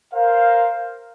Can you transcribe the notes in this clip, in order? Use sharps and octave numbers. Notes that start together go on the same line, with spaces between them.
A#4 C5 F5